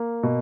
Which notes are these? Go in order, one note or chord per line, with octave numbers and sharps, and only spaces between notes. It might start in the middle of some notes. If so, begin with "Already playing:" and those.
Already playing: A#3
B2